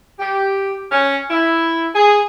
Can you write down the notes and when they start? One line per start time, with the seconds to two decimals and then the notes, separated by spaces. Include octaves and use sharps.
0.19 G4
0.91 C#4
1.30 E4
1.94 G#4